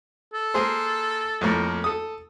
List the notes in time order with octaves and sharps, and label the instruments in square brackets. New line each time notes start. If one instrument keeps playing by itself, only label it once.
[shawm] A4
[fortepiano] A#3 G#4 C5
F2 A2 A#3
A4 D#6